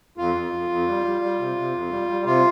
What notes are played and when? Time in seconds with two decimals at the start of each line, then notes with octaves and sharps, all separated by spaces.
0.18 F2 F4
0.35 F2
0.53 F2
0.69 F2
0.87 G3
1.05 G3
1.21 G3
1.38 C3
1.56 C3
1.73 F2
1.91 G3
2.09 G3
2.25 C3 F4